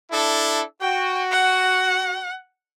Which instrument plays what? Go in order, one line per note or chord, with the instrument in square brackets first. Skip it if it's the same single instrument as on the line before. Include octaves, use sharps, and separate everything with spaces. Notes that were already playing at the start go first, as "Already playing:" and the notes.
[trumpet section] D4 E4 A4
[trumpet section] F#4 [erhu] G5
[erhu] F#5